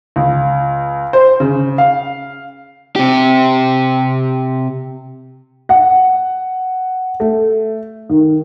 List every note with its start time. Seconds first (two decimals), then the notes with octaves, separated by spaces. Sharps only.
0.16 C#2
1.13 C5
1.40 C#3
1.78 F5
2.96 C3 G4
5.69 F#5
7.20 A3
8.10 D#3